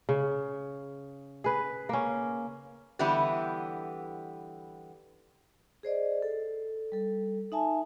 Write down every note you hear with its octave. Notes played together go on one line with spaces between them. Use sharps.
C#3
G#4 B4
A#3 C#4
D3 E3 G3 B3 E4 G4
G#4 C5 D5 D#5
A4
G3 A4
D#4 E5 G#5 A5